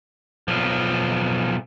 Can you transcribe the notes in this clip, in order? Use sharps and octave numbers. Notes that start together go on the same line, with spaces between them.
B1 F3